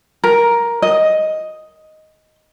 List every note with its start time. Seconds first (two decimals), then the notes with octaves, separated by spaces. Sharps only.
0.24 A#4
0.82 D#5